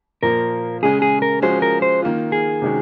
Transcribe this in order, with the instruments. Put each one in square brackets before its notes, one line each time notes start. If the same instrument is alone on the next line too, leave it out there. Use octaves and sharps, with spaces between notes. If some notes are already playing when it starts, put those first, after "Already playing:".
[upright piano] A#2 F3 A#3 [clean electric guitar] A#4
[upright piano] C#3 G#3 C#4 [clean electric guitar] G#4
[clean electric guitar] G#4
A#4
[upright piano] F3 G#3 C#4 F#4 [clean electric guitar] C5
[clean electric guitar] A#4
C5
[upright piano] D#3 A#3 F4
[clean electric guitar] G#4
[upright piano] C3 D#3 G#3 C#4 F#4